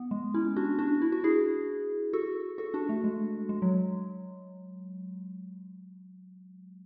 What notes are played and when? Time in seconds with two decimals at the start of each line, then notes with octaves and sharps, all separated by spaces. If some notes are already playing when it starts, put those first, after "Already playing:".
Already playing: B3
0.11 G#3
0.34 C#4 E4
0.56 D4 F#4
0.79 D4 F#4
1.02 E4
1.12 F#4
1.24 E4 G#4
2.13 F#4 A4
2.58 F#4 A4
2.74 D4 F#4
2.89 A3
3.04 G#3
3.49 G#3
3.62 F#3